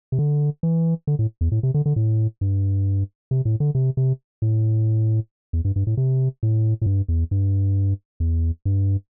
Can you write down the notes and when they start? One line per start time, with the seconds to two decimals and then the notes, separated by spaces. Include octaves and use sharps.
0.12 C3
0.19 D3
0.63 E3
1.07 D3
1.19 A2
1.41 E2
1.52 A2
1.63 C3
1.74 D3
1.86 D3
1.96 A2
2.41 G2
3.31 C3
3.45 A2
3.60 D3
3.75 C3
3.97 C3
4.42 A2
5.53 E2
5.65 G2
5.76 G2
5.87 A2
5.97 C3
6.43 A2
6.82 A2
6.86 G2
7.08 E2
7.31 G2
8.20 E2
8.65 G2